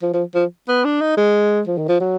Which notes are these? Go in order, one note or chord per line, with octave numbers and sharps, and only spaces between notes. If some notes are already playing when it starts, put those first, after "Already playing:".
F3
F3
F3
B3
D4
D#4
G#3
F3
D#3
F3
F#3